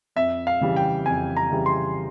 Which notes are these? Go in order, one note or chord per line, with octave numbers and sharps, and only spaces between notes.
F2 E5
F5
C#3 E3 G3
G5
F2 G#5
A#5
C#3 E3 G3
C6